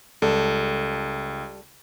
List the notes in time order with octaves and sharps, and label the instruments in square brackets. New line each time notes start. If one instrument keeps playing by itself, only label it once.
[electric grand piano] C#2 [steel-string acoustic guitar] G3 A4